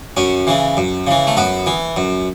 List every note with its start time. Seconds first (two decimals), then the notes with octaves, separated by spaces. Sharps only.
0.17 F#2 C#4
0.47 C#3 E3
0.77 F#2
1.07 C#3 E3
1.27 A3
1.37 F#2 B3
1.66 E3
1.96 F#2